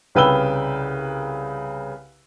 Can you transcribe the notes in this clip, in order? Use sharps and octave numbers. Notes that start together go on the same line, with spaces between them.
C2 C#3 B4 G5 E6 G7